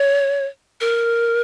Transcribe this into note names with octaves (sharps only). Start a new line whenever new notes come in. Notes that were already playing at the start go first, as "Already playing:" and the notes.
Already playing: C#5
A#4